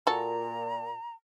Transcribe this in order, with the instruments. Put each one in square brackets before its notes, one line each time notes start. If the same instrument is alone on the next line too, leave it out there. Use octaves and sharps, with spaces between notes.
[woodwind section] A#2 [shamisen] F#4 A4 [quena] A#5